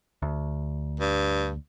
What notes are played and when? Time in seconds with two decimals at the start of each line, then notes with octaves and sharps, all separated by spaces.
0.22 D2
1.00 G2